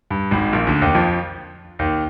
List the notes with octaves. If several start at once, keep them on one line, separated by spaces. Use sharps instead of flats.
G2
G#1 G#2
A#1 A#2
D2 D3
D#2 D#3
F2 F3
D#2 D#3